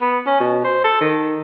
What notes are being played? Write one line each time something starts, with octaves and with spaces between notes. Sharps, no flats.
B3
C#4
B2
C5
A4
D#3